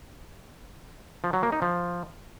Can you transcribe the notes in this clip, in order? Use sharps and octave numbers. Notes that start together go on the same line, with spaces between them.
F3
F#3
A#3
D#4
F3